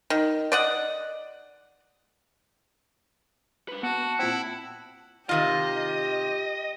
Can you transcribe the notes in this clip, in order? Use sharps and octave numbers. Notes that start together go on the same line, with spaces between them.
D#3
D5 D#5 F#5
D4 B4
B3 F#4 F#5 A5
A#2 C4 E4
C3 D#3 F4 G4 D#5